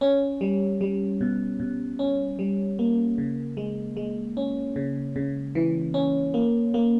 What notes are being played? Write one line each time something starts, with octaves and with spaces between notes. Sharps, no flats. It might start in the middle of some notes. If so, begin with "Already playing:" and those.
C#4
G3
G3
B2
B2
C#4
G3
A#3
C#3
G#3
G#3
C#4
C#3
C#3
E3
C#4
A#3
A#3